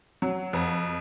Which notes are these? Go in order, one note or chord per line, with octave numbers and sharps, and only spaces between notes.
F#3
F2